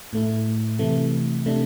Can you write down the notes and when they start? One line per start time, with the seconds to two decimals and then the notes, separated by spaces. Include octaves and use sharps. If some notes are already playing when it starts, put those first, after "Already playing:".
0.13 A2 A3 E4
0.79 C3 E3 A3
1.46 C3 A3 D4